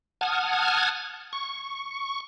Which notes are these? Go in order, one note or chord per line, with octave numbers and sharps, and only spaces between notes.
F#5 A5 D#6 F6 G#6
C#6